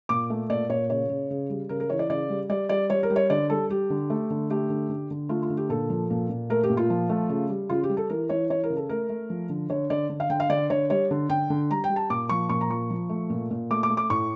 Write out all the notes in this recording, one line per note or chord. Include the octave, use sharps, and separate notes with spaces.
A#2 D6
A3
A#2 D5
A#2 C#5
C#3 C#5
C#3
C#3
G3
C#3 A#4
A#4
E3 C#5
D5
C#3 D5
G3
G3 D5
G3 D5
G3 C#5
A#4
G3
C#5
D3 D5
G3 A4
G3 G4
D3
A3
D3
A3 G4
D3
D3
D3
A3 F4
F4
D3
G4
A#2 A4
F3
A#2
A#2
A3 A#4
G4
A#2
F4
F3
A3
C#3
G3
C#3 F4
G4
G3
A4
E3 A#4
E3 C#5
E3 C#5
A#4
C#3
A4
A3 A#4
A3
F3
D3
D3 C#5
D3 D5
D3
F5
D3 G5
F5
D3 D5
D3 C#5
G3 C#5
D3
D3 G5
D3
G3 A#5
G5
G3
A5
A#2 D6
F3 C#6
A#2 C#6
A#5
F3 C#6
F3
A3
A#2
A#2
A3 D6
D6
A3
D6
A2 C#6